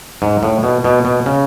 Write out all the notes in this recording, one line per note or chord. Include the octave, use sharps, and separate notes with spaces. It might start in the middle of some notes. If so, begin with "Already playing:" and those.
G#2
A2
B2
B2
B2
C#3